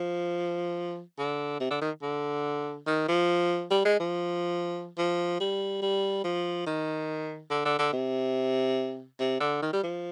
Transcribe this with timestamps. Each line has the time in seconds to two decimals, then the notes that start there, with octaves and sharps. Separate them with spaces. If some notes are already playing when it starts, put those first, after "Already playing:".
Already playing: F3
1.18 D3
1.60 C3
1.70 D3
1.81 D#3
2.02 D3
2.87 D#3
3.08 F3
3.71 G3
3.85 G#3
4.00 F3
4.98 F3
5.40 G3
5.82 G3
6.24 F3
6.66 D#3
7.50 D3
7.65 D3
7.79 D3
7.93 C3
9.20 C3
9.40 D3
9.62 D#3
9.73 G3
9.83 F3